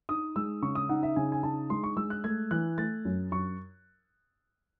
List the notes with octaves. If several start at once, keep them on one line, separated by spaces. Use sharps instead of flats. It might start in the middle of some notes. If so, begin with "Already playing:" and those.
D#4 D#6
G#3 E6
C#3 C#6
D#6
D#4 F#5
E5
C#3 G#5
G#5
D#4 A5
G#3 C6
C#6
G#3 E6
F#6
A3 G#6
E3 F#6
A3 A6
F#2
F#2 C#6